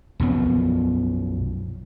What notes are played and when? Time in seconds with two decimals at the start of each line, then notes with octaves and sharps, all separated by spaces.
0.20 B1 F#2 F3 B3